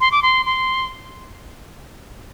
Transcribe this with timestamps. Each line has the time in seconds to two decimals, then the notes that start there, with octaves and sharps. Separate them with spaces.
0.01 C6
0.12 D6
0.22 C6
0.46 C6